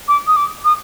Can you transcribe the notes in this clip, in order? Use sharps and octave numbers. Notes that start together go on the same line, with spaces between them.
D6
D#6
D6
D#6